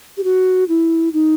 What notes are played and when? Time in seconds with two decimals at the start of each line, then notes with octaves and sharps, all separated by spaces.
0.17 G4
0.24 F#4
0.69 E4
1.13 D#4